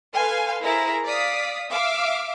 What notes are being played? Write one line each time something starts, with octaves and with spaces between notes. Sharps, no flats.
A4 B4 F5 G#5 C6
E4 G#4 A#4 C5 A#5
D5 F5 D#6 B6
E5 F5 D6